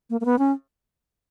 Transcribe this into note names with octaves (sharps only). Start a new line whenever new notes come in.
A#3
A#3
B3
C#4